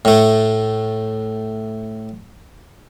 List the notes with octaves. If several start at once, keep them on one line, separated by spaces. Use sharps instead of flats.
A2 A3